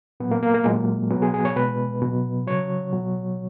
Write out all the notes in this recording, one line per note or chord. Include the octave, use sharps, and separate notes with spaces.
A#2 F#3 B3
A#3
A#3
A#3
A#2 F#3 G#3
A#3
B2 F#3 B3
G#4
G#4
C#5
B2 G#3 B4
B2 F#3
C#3 F#3 C#5
B2 F#3